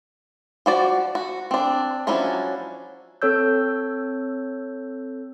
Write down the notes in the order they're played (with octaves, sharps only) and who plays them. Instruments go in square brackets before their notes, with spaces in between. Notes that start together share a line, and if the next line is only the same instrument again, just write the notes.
[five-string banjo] F3 F#4 D5
F#4
C4 D4
F3 F#3 C#4 D4 E4
[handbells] C4 A4 C#5 E6 G6